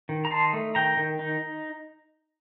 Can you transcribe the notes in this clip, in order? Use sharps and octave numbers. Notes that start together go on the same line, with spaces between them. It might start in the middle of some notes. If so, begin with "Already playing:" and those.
D#3
A#5
D#4 A5 C6
A3
D#3 G5 A#5
D#3
D#4